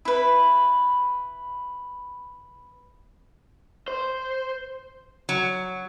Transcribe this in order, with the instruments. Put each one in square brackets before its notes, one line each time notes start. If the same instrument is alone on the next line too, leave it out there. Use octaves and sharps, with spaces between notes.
[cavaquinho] E4 B4
[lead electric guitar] C5
[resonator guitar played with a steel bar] F#3